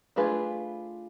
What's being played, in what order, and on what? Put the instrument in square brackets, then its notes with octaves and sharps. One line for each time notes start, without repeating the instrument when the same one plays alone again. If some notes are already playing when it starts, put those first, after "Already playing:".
[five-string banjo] A3 D4 F4 G#4 B4